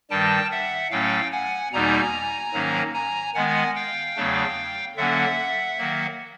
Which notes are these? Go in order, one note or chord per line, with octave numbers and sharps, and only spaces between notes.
G2 D#3 G3 G5 A5
E5 F#5
A2 F#3 A3 C#4 F5 G5
F#5 G#5
E2 B2 G3 A#3 D#4 G#5 A#5
G#2 D#3 F#3 A#3 C#4
G#5 A#5
D#3 G#3 B3 F#5 G#5
F5 G5
E2 C#3 F#3 A3 D4
D3 F#3 A#3 C#4 E5 F#5
D#3 F#3 A#3